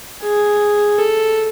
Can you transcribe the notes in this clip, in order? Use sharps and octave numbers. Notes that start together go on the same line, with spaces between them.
G#4
A4